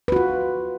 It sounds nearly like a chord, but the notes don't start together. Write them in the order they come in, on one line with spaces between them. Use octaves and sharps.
B4 F#4 F4